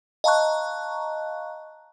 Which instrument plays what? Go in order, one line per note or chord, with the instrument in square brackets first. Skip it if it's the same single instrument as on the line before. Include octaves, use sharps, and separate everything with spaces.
[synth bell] D#5 F5 A5 A#5 C#6 F#6